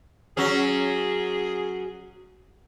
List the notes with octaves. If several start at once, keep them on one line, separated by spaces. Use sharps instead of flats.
F#3 C#4 G#4